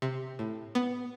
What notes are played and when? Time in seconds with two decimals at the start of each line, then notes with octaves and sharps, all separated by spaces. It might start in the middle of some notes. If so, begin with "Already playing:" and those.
0.02 C3
0.39 A2
0.75 B3